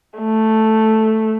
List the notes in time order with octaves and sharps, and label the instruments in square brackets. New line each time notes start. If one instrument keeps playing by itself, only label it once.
[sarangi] A3